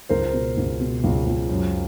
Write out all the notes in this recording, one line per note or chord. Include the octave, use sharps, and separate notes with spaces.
C#2 A#4 C5
B2
C#2
B2
C#2
C#2
F#2